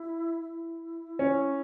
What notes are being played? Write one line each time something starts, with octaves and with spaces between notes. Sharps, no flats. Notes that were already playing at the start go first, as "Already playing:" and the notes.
Already playing: E4
E4
C#4